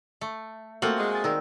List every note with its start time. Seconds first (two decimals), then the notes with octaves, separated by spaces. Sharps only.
0.21 A3
0.82 A3 A#3 C4 F4 F#4 F#5
0.97 G#3
1.11 G#5 A6
1.24 D#3 A#4 D5 E6